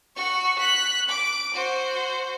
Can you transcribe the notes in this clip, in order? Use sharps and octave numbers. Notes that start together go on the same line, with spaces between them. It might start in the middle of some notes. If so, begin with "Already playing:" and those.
F#4 C#6
F#6 B6
D6
F#4 C5